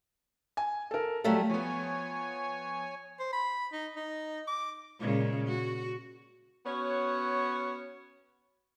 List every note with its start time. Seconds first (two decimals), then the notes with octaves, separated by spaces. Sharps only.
0.57 G#5
0.91 A4 A#4
1.24 F#3 G3 A3 A4 F5
1.50 F3 B3 C#5 G#5
3.19 C5
3.33 B5
3.73 D#4
3.96 D#4
4.47 D6
4.99 A#2 C#3 G#3
5.47 F#4
6.65 B3 C#4 F#4 C#5